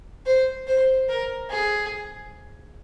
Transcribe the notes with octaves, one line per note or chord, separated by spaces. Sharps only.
C5
C5
A#4
G#4